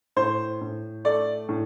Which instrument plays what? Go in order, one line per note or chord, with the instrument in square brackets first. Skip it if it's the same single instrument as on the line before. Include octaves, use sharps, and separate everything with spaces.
[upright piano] A2 C5
A2
A3 D5
A2